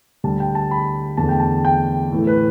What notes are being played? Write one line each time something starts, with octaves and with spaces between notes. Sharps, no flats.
D2 D3 G3 A5
G5
A5
B5
E2 D3 A3 A5
G5
A5
G5
A2 E3 A3
B4